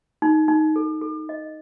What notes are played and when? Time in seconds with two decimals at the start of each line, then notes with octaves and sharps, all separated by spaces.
0.22 D#4
0.48 D#4
0.76 A4
1.02 A4
1.29 D#5